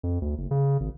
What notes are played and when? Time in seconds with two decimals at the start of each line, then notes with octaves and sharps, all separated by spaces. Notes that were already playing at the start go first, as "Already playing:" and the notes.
0.03 F2
0.22 D2
0.38 F#1
0.51 C#3
0.80 G#1